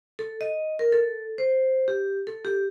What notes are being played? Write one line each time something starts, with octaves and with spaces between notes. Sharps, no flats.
A4
D#5
A#4
A4
C5
G4
A4
G4